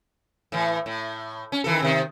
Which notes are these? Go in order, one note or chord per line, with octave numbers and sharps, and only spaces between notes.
A2 E3
A2
C#4
D#3 E3 A4
C3 D#3